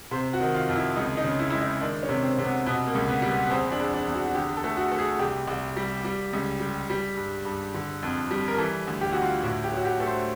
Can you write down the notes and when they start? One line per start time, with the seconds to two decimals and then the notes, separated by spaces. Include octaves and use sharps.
0.11 C3 C5
0.33 F#4
0.40 D#3
0.54 F4
0.69 F2
0.76 E4
0.96 C#2 D#4
1.17 D#4
1.24 C#3
1.39 E4
1.50 G#3 E4
1.61 D#4
1.81 D#3 D4
2.03 C#4
2.09 C3
2.23 C4
2.38 C3
2.44 B3
2.66 B2 B3
2.86 A#3
2.95 C#2
3.08 B3
3.22 G3
3.29 B3
3.46 B3
3.50 E2 C4
3.72 D4
3.79 E2
3.93 D4
4.07 E2
4.15 F#4
4.27 F#4
4.35 D3 G4
4.57 A4
4.64 A3
4.77 F#4
4.92 A3
4.99 G#4
5.19 C2 G4
5.48 C2
5.76 G3
6.05 G3
6.33 C#2
6.60 G3
6.90 G3
7.17 G2
7.45 G2
7.74 D3
8.03 F2
8.31 G3
8.48 A#4
8.58 E3 A4
8.87 D2
9.01 G4
9.13 D2 F#4
9.22 F4
9.43 A2 F#4
9.64 G4
9.72 F#3 F#4
9.85 G4
10.00 A3
10.07 C5